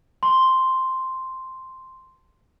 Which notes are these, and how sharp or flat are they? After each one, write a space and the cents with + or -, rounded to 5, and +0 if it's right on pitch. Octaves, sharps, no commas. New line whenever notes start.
A5 +10 C6 +0